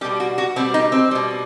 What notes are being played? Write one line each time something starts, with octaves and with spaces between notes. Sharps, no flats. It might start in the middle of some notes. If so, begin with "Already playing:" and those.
B2 G3 G4
F#4
F#4
B2 G3 C4
D#4
C4
B2 G3